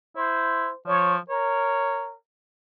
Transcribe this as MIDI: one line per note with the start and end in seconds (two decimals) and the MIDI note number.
0.16 0.68 64
0.16 0.75 72
0.87 1.18 53
0.87 1.15 73
1.30 2.16 70
1.30 2.12 73